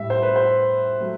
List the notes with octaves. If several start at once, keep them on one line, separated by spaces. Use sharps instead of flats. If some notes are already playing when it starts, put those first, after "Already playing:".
Already playing: A2 G3 E5
C5
B4
C5
F#3 A3